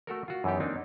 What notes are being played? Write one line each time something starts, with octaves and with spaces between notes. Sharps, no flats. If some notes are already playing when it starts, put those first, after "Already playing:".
A3 F#4 A4 A#4
F4 F#4
F#2 E3 B3 D#4 G4
A#3 C4 D4 D#4